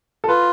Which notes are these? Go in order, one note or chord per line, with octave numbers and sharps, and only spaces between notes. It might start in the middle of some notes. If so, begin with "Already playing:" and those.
A4
F4 B4